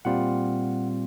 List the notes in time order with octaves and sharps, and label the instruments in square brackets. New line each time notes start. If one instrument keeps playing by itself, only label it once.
[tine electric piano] A#2 G3 C4 F4 F#5